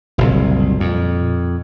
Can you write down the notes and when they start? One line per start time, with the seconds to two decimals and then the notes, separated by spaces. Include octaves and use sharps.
0.18 F#1 C2 A#2
0.80 F2